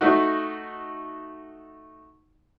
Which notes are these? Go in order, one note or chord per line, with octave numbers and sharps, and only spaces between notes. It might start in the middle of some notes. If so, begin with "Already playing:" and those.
A3 D#4 F#4